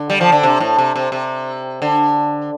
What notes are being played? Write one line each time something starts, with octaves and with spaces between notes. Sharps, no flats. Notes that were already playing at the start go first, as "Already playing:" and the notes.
Already playing: D3
G3
F3
D3
C3
A2
C3
C3
C3
D3